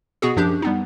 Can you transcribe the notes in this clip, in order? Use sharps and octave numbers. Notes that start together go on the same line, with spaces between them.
B2 B3 F#4 G#4
F#2 F3 D4 G4 G6
G3 B3 D#4